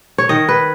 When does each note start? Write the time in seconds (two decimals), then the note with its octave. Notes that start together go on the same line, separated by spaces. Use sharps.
0.18 C#5
0.29 D#3 D#5
0.49 B4